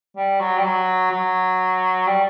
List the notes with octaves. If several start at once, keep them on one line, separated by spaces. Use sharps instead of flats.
G3
F#3
G3
F#3
F#3
G3